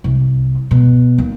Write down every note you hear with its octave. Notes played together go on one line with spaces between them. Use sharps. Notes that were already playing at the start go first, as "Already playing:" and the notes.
C2
B2
D#2